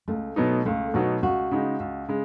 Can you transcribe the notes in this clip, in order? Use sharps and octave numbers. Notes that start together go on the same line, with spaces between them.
C#2 A3
B2 F#3 B3 D#4
C#2 A3
B2 F#3 B3 D#4 F#4
C#2 F#4
C#3 G#3 D#4
C#2
C#3 G#3